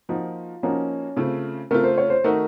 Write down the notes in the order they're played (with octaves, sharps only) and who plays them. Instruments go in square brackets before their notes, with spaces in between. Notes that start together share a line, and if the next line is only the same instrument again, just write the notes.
[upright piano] F3 A#3 D#4 F#4 [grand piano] F4
[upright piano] F3 A#3 D#4 F#4 [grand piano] C#4
[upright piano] C#3 A3 C4 F4
[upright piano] C#3 A3 C4 F4 [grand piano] A#4
[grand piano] C5
C#5
C5
[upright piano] D#3 A3 D#4 F#4 [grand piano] A#4